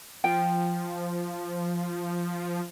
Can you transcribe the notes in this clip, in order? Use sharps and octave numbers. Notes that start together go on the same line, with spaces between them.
F3 G5